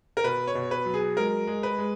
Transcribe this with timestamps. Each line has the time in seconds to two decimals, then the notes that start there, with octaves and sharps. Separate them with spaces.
0.17 A#4
0.24 B2 B4
0.47 C#5
0.55 B2
0.71 B4
0.86 F#3
0.94 G#4
1.17 G#3 A#4
1.47 G#3
1.63 B4
1.78 G#3